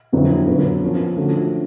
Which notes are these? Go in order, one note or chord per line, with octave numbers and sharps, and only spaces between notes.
F2 D3 F#3 B3 E4
D3 F#3 B3
F3 A#3 C#4
D3 F3 A3 C#4 F#4